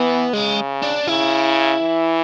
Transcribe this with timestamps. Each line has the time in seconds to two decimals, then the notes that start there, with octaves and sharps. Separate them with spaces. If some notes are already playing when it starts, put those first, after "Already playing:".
Already playing: E3 B3
0.33 C#3 G#3
0.83 D4
1.08 C#3 E4
1.82 E3